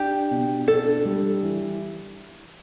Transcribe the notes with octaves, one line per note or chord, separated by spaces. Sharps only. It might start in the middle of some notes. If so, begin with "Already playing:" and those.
Already playing: D4 G4
B2
D4 A4
G3
E3